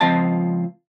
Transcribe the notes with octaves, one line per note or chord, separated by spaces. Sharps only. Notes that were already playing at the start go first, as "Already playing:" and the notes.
C#2 F3 C4 F4 D#5 A5